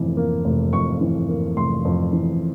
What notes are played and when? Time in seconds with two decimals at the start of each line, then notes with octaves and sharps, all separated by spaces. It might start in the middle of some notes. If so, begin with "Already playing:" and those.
Already playing: F1 F2 E3
0.17 A#3
0.45 F1
0.73 F2 C#6
1.01 E3
1.29 A#3
1.57 F1 C6
1.85 F2
2.13 E3